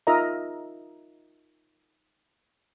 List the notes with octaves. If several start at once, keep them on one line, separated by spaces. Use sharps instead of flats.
D#4 F4 A#4 D#5 E5 A#5